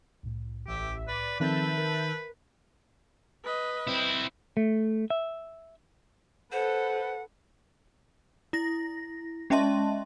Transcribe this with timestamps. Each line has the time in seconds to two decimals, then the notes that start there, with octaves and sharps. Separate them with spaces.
0.23 C2 A2
0.67 A1 G4 E5
1.07 B4 D5
1.40 D#3 F3 C4 A4 B4 E5 A5 G6
1.78 A#4
3.44 B4 D#5
3.87 C4 E4
4.57 A3
5.10 E5
6.52 A4 B4 C5 F#5
8.53 E4 A#6
9.50 G#3 C#4 D#5 E5 A5 C6